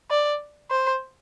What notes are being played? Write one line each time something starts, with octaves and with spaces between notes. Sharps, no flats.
D5
C5